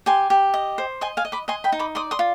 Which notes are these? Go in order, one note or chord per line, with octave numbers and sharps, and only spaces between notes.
G4 G#5 C6
G4
D#5
C5
D#5 G#5 C6
F5 G#5
D#5
B5 D6
D#5 G#5 C6
G5 B5
D#4
B5 D6
D5 C6 D#6
C6 D#6
F4